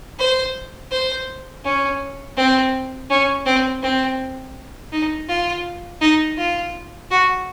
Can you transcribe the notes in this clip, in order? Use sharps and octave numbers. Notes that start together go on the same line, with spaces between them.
C5
C5
C#4
C4
C#4
C4
C4
D#4
F4
D#4
F4
F#4